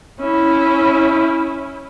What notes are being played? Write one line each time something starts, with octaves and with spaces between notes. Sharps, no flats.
C#4 E4